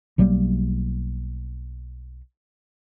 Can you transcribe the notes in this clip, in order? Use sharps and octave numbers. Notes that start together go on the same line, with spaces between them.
B1 F#3 G3 A#3